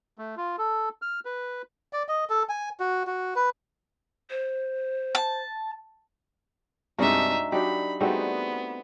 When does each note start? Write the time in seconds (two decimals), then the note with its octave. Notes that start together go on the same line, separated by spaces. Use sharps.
0.18 A3
0.37 F4
0.58 A4
1.02 F6
1.25 B4
1.93 D5
2.09 D#5
2.30 A4
2.49 G#5
2.80 F#4
3.07 F#4
3.36 B4
4.30 C5
5.15 A5
6.98 G2 C3 G#3 D4 D#4 F#4 E5
7.52 F#3 D4 D#4 G4 B5
8.00 G3 A3 B3 C4 D#4 F#4 G#4